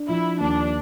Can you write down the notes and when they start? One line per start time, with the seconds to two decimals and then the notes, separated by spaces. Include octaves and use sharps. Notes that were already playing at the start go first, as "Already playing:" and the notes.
Already playing: D4
0.08 F3 E4
0.40 D#2 D4